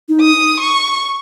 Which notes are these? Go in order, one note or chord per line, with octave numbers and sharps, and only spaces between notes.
D#4
D#6
C#6